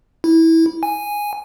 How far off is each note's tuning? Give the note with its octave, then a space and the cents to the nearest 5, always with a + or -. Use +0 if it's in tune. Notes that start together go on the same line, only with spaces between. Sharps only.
E4 -20
G#5 -5